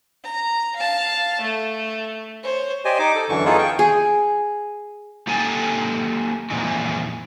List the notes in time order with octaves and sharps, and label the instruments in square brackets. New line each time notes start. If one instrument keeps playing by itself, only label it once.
[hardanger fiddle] A#5
F5 A5
A3
C5 C#5
[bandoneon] G4 C5 D5 D#5 G#5
D#4 D6
A4
F#2 D3 E3 C#6
B3 D#4 F4 G#4 A4
G5 C#6
[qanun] G#4
[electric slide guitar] A#3 D#4 G4 A4 G#5 A5
F2 A#2 E3 G#3